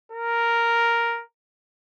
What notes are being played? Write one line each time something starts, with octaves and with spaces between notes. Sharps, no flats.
A#4